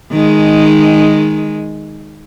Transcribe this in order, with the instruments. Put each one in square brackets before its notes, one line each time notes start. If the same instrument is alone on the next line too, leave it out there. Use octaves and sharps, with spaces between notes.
[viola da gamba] D#3 G#3